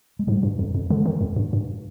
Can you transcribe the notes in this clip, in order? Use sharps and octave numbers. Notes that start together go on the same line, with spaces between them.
G#3
G#2 G3
G2
F2
F2
D3 G#3
D#3
F2
G2
G2